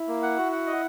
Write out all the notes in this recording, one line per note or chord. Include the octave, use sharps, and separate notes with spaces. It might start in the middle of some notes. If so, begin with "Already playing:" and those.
Already playing: E4
A#3
F#5
F#4
F#5
D#5